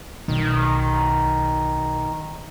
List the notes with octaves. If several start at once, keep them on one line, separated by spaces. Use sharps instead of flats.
B1 D#3